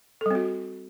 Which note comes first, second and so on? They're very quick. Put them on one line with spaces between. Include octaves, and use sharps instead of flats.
A4 G3 C4 F#4